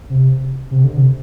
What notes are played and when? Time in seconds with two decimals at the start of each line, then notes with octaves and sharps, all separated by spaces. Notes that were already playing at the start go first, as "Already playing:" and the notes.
0.10 C3
0.71 C3
0.84 D3
0.97 C3